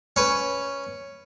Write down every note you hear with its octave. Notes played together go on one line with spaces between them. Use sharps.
C#4 B4